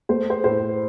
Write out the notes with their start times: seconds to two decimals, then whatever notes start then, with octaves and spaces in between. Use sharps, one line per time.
0.09 A3 C5
0.30 C5
0.44 A2 C5